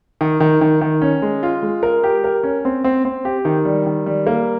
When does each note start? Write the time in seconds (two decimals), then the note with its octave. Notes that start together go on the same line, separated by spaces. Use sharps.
0.21 D#3
0.40 D#3
0.61 D#3
0.81 D#3
1.02 C#4
1.22 G#3
1.43 F4
1.63 G#3
1.83 A#4
2.04 G4
2.24 A#4
2.43 C#4
2.65 C4
2.84 C4
3.05 C4
3.25 G4
3.45 D#3
3.65 G3
3.86 D#3
4.06 G3
4.27 A#3